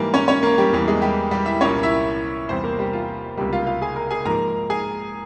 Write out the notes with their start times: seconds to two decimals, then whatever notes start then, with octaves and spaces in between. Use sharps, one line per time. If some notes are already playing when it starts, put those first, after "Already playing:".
Already playing: G#2 E3 G3 A#3 A#4
0.14 C#4 C#5
0.28 C#4 C#5
0.43 A#3 A#4
0.58 G3 G4
0.72 E2 E3 G3 A#3
0.88 G#3 G#4
1.02 G3 G4
1.31 G3 G4
1.46 E4 E5
1.61 C2 A#2 G3 A#3 C#4 C#5
1.83 E4 E5
2.49 E2 C3 G3 C4 C5
2.64 A#3 A#4
2.79 G3 G4
2.93 F4
3.37 C#2 C3 G3 A#3 G4
3.53 F4 F5
3.67 F4 F5
3.82 G#4 G#5
3.96 A#4 A#5
4.11 G#4 G#5
4.25 G#2 F3 A#3 A#4 A#5
4.70 G#4 G#5